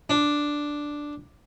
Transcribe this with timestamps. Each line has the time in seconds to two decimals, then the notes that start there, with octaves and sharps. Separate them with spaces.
0.10 D4